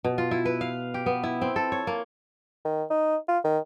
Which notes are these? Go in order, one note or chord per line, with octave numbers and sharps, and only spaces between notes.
B2
F4
E4
B4
F5
G4
B3
E4
C4
A4
C#5
A#3
D#3
D#4
F4
D#3